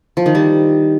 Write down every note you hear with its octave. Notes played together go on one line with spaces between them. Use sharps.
F3
D#3
G3